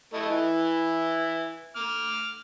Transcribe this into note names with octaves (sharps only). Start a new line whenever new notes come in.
A3 E4 D#5
E3 E4
D6 F6